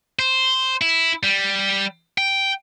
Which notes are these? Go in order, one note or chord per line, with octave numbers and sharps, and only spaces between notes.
C5
E4
G3
G5